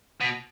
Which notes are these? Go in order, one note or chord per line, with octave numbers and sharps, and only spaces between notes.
B2